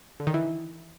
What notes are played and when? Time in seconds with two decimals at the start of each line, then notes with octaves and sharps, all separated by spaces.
0.20 D3
0.27 D#3
0.34 E3